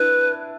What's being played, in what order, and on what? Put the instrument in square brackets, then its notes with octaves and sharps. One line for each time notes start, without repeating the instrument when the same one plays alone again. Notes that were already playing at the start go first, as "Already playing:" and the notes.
Already playing: [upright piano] D4 E4 [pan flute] B4